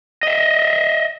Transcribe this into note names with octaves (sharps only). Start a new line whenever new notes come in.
D#5 E5